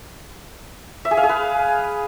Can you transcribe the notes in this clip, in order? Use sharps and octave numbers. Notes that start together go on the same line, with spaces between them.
E5
G#4
F5
G#4
B4